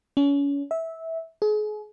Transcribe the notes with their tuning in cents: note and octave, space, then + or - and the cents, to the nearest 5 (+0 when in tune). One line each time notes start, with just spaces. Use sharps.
C#4 +30
E5 -15
G#4 +35